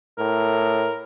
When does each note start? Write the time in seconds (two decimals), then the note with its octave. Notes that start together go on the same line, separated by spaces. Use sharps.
0.18 A2 A#4